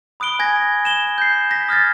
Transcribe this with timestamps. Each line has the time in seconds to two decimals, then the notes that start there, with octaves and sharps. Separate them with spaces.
0.20 B5 D#6 F#6 D7 G7
0.39 G#5 G#6 A#6
0.85 E7 G7
1.18 G6 C7
1.51 A#6 B6
1.69 D#6 F6 G#6 A6